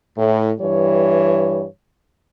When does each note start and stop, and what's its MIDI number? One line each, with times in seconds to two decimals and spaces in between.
0.17 0.50 45
0.60 1.64 43
0.60 1.64 52
0.60 1.64 55
0.60 1.64 73